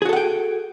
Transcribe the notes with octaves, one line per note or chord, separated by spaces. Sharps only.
F#4 G#4 A4 F#5 G5